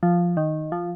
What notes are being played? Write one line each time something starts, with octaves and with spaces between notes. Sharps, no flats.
F3
D#3
F3